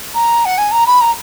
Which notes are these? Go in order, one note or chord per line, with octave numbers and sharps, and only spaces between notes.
A#5
F#5
G#5
A#5
B5
A#5